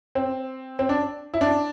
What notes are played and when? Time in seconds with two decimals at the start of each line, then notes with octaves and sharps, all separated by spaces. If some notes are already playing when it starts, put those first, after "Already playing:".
0.15 C4
0.79 C4
0.89 D4
1.34 E4
1.41 D4